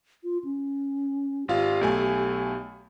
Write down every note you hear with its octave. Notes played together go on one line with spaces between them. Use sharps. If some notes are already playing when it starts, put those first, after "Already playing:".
F4
C#4
G#1 F4 G4 F5
B1 A3 G#5